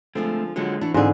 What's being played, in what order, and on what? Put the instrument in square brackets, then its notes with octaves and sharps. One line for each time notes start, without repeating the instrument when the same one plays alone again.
[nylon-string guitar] D3 F3 G#3 [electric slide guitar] A3 C4
[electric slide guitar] D3 G#3 [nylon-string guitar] F3 F#3 F#4
[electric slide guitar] E3 [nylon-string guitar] D4 F#4
[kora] G#2 D3 [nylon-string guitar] C4 F4 G#4